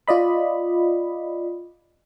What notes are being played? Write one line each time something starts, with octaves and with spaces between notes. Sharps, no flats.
F4 D5 D#5 B5